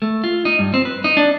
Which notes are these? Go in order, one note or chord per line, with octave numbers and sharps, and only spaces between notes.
A3
F4
D#4
G2
C4
B4
D#4
D4